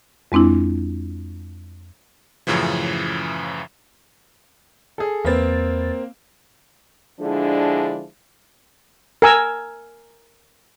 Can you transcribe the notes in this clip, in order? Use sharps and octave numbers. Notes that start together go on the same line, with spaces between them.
F2 G#3 C4 D4 E4
F#2 A2 C#3 E3 F3
G#4 A4
E2 A#3 C4 B4 A6
D3 F3 G#3 D4 E4
A#4 G#5 E6